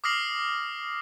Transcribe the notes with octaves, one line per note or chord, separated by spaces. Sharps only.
D6 D#6 F6 A#6 C7 F#7